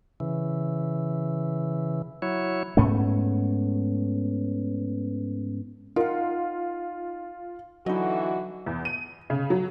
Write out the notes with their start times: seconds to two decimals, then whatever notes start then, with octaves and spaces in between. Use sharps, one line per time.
0.20 C#3 E3
2.22 F#3 E4 C#5
2.77 G#2 A3 B3 C#4
5.96 D#4 F4 A#4 F#5
7.86 D3 E3 F#3 D#4 F#4 D#5
8.66 E2
8.85 D#7
9.30 C#3
9.50 F#3